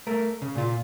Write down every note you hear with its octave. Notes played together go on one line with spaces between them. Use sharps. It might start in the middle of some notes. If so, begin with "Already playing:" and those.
A3 A#4
C#3
A#2 F4